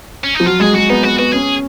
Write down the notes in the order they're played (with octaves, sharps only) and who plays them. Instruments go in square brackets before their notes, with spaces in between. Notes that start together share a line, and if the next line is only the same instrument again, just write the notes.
[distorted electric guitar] C#4
D#4
[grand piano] F3
[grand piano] F#3 [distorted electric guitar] F4
[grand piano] G#3 [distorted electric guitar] G#4
[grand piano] G#3 [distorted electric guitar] F#4
[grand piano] B3 [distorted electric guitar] D#4
[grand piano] B3 [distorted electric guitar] F#4
[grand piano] B3 [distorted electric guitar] F#4
[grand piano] C#4 [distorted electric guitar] G#4